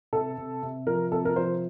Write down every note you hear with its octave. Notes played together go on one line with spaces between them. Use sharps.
C3 A4
C3
C3
F3 A#4
C3 A4
A#4
F3 C5